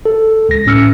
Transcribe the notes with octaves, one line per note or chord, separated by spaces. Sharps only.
A4
C#2 A#6
A2 C#4 E6 F6 C#7